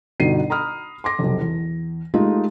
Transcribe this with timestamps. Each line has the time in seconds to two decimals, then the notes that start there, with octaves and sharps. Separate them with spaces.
0.20 G1 B2 D#4 C7 D#7
0.50 A#5 B5 D#6 F6
1.04 C6 D6 A#6
1.19 F1 B1
1.40 E2
2.14 G#3 A3 D#4 F4 G4